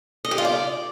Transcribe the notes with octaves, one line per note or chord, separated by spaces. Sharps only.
D#5
G4
F4
D5